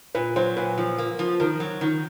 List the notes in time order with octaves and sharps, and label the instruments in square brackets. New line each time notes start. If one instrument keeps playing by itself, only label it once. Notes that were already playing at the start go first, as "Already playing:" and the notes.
[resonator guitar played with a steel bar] A#2 [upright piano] B4
[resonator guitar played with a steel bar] F#3 [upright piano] C5
[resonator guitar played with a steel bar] A#2 [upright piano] B4
[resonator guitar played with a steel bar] F3
A#3
F3
[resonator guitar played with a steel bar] D#3 [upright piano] A#4
[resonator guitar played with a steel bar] F#3
D#3